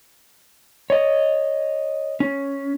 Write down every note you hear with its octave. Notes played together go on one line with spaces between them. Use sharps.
C#5 D#5
C#4